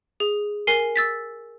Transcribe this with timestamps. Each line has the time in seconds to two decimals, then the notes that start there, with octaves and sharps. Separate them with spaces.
0.20 G#4
0.67 A#4 G#5 C7
0.96 E6 A6 B6